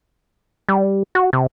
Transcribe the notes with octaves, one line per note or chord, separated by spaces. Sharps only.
G3
F#4
C3